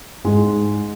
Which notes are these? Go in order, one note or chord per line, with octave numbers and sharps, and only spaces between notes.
G#2 G#3